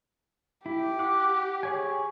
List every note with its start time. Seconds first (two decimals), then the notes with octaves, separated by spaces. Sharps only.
0.66 E4 G4
0.99 F#5 D6
1.63 G#4 C#5 G#5